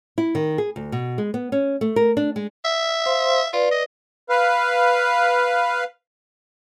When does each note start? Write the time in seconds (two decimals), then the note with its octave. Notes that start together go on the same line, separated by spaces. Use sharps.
0.18 E4
0.35 D#3
0.58 G#4
0.76 D2
0.92 B2
1.18 G#3
1.34 B3
1.52 C#4
1.81 A3
1.96 A#4
2.17 D4
2.36 G#3
2.65 E5
3.06 C5 F5 C6
3.53 F4 B4 D5
3.71 D#5
4.29 B4 F5